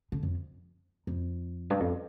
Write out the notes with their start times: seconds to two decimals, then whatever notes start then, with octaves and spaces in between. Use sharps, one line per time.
0.12 D3
0.23 F2
1.07 F2
1.70 G2
1.80 F2